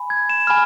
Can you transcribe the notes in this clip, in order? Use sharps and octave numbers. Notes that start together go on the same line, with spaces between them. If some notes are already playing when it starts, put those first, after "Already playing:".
Already playing: G#5 B5
G#6
E7
G#5 B5 F6